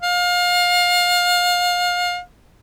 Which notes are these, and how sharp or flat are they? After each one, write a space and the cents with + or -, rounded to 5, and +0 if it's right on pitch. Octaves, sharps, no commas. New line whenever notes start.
F5 +30